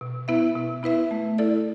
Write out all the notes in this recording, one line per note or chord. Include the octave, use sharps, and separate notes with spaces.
B2
B3 E4 B4 E5
B2
B3 E4 B4 E5
A3
E4 A4 D5